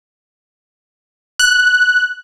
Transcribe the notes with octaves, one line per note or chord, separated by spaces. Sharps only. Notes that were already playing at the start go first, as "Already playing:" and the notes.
F#6